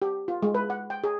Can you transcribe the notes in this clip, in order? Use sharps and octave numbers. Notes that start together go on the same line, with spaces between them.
G4
F4
G#3
B4
F#5
G5
G#4